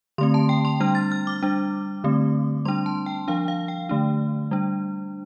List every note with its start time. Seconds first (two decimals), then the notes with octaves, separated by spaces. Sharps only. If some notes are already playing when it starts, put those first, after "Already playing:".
0.18 D3 A3 C4 C6
0.34 A5
0.49 G5
0.65 C6
0.80 G3 D4 F6
0.95 A6
1.12 F6
1.27 D6
1.43 G3 D4
2.04 D3 A3 C4
2.65 G3 D4 C6
2.86 A5
3.06 G5
3.28 F3 D4 F5
3.48 F5
3.68 G5
3.89 D3 A3 D4
4.51 G3 D4